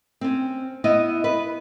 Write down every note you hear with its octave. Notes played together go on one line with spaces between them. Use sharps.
C4 C#4
B3 E4 D#5
B4